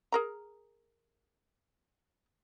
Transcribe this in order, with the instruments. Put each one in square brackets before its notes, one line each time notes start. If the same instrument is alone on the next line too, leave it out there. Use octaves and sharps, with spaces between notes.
[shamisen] G#4 A#4 A#5